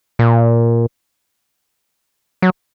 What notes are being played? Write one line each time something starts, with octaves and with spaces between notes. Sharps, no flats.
A#2
F#3